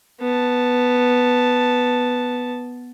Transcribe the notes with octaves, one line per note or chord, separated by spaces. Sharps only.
B3 A5